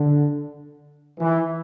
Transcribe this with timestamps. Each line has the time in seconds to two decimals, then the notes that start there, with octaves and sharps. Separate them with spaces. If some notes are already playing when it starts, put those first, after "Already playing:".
Already playing: D3
1.19 E3